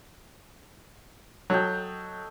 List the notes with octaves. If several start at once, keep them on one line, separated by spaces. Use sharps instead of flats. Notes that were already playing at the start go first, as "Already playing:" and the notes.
F#3 A4 D#5 G5